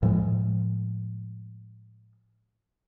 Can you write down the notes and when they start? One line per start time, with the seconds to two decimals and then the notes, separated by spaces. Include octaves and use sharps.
0.03 A2 F3 G#3